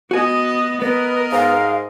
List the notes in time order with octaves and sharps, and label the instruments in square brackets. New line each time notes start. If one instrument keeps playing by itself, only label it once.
[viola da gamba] B3 D#5 [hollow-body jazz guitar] F#4 G#5
[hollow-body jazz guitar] B3 [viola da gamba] A#4 D#5 [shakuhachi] B4
[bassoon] G#2 [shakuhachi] F5